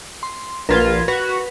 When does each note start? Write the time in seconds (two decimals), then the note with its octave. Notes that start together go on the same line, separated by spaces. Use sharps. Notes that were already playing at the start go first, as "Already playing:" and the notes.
0.23 C6
0.69 A#1 F4 A#4 B4 G#6
1.08 F#4 B4